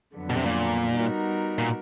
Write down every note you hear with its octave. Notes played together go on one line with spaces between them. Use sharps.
F2 D3 F#3 B3 D4
B2
C3
A#2
G3 B3 D#4 F#4 A#4
A#2